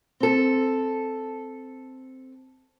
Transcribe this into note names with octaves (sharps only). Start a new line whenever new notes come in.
C4 A4